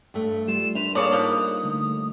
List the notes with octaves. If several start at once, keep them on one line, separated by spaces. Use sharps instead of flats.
G2 A3
G3 F4 E7
D4 B4 C5 E5 F7
C#3 A#3 G#4 A#4 C#5 D5 D#6
F3 D#4 A#4 B4
D3 G3 A3